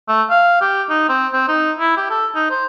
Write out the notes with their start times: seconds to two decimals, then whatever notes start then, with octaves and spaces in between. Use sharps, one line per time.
0.08 A3
0.30 F5
0.61 G4
0.89 D#4
1.09 C4
1.33 C4
1.48 D#4
1.78 E4
1.97 G4
2.10 A4
2.35 D#4
2.50 C5